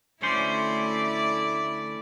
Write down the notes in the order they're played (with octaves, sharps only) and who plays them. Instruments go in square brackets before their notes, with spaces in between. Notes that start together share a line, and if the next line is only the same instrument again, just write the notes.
[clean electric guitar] D2 C#4 C5 [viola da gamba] A3 E4 D5